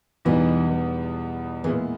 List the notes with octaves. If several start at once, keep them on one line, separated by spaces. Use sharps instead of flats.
E2 B2 E3 G3 B3 D#4
A#2 E3 G#3 B3 E4 G#4